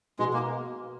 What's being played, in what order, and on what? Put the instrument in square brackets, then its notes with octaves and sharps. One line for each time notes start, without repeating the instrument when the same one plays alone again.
[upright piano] B2 [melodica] G#3
[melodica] A#3